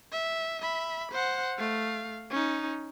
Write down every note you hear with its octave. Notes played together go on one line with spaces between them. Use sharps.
E5
E5 B5
C5 F#5
A3 F5
C#4 D#4